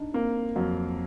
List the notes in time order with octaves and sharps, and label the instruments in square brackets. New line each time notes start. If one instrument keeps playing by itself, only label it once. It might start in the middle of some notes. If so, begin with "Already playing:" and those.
Already playing: [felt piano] D4 D#4
[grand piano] A#3 [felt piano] C4
[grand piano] F2 [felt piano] F#3